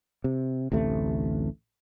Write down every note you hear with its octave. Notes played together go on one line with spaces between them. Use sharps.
C3
A1 D2 C3 A3